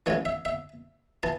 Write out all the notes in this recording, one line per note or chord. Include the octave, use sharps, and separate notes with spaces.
A1 A2 E3 C#5
E5
E5
E3 A5